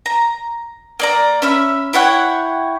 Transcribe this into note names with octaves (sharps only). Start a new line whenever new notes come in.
A#5
A#3 D5 A#5
C#4 E5 B5
E4 C#5 F#5 G5